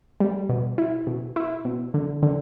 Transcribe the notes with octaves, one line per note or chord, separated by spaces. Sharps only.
G3
B2
E4
B2
E4
B2
D3
D3